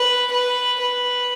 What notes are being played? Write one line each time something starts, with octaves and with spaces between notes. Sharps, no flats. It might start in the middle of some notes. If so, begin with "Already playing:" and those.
Already playing: B4
B4
B4